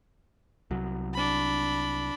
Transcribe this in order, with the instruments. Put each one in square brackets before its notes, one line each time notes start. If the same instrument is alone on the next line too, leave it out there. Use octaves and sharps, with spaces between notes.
[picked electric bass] C2 F#3
[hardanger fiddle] D4 B5